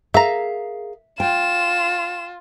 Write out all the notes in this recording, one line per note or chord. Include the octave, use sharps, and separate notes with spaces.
G#4 A#4 E5 F5 A#5
F4 G5 E7